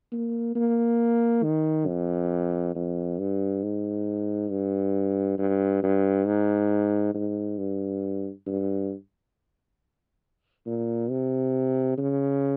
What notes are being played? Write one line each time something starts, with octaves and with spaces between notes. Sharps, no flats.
A#3
A#3
D#3
F2
F2
G2
G#2
G2
G2
G2
G#2
G#2
G2
G2
A#2
C3
C#3